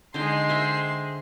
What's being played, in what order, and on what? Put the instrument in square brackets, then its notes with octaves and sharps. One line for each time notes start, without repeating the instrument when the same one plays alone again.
[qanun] D3 D#4 G5 [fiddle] G#3 C6
[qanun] C5 E5 G5